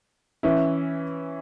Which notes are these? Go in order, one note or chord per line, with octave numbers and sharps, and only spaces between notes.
E3 C#4 E4